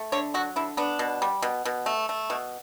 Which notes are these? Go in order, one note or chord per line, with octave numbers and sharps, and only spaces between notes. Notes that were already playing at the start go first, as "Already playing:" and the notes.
Already playing: A3
D3 C#5
F#3 F#4
D3 E4
B3 D4
B2
G3
B2
B2
A3
A3
B2